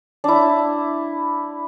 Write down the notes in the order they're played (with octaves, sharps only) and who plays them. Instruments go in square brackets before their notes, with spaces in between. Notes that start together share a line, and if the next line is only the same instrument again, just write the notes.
[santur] D4 E4